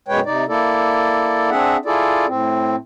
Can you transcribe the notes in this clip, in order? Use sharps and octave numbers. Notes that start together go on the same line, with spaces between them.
F#2 B2 G#3 B4 C#5 G5
C3 D#4 D5
A#3 E4 A4 D5
C4 D4 G#4 E5 F#5
E4 F4 G#4 A4 D5
A2 C4